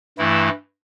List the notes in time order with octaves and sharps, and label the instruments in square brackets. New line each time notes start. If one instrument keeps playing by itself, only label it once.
[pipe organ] G2 E3 A3 E4